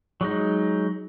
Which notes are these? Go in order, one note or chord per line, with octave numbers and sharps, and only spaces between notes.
F#3 G#3 D#4